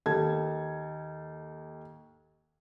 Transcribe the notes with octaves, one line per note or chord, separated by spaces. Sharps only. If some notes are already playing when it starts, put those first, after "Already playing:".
D#2 A4 A5 G#6